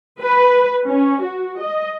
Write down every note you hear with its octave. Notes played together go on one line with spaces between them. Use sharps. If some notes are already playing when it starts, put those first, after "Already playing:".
B4
C#4
F#4
D#5